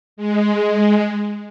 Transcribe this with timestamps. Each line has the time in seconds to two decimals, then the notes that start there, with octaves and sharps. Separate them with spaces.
0.17 G#3